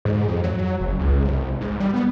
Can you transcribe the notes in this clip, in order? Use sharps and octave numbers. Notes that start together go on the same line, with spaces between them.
G#2
F2
F#3
F#1
C#2
C2
G#2
G3
B3